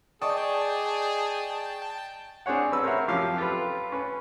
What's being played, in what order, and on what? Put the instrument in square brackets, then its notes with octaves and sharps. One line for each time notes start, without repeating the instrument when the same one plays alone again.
[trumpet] G#4 [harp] D5 [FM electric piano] D#5 C#6 D#6 [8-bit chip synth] G5 A5
[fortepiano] C4 D4 G#4 C#5 F#5
A1 B4 E6
C4 A#4 C#5 E5 F#5
F#2 C3 F3 G4 F5
F4 G4 A4 B4
C#4 B4